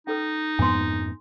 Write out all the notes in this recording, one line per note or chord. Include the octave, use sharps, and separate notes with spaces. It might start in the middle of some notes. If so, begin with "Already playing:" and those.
C#4 D#4 A4 B4
F2 G#2 B3 G#5 C6